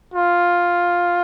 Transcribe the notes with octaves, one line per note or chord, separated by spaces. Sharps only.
F4